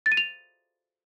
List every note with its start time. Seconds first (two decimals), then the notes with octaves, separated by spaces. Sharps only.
0.06 A6
0.12 D#7
0.17 F7